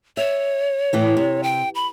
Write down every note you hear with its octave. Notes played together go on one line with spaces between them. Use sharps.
C#5 E5
A2 E3 A3
C3
G5
B5